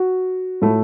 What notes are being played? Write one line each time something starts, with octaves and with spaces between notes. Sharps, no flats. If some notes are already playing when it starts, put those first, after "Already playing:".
Already playing: F#4
A2 A3